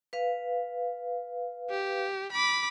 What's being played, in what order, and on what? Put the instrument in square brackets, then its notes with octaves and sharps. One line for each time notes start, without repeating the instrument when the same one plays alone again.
[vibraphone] B4 F5
[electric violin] G4
B5 D6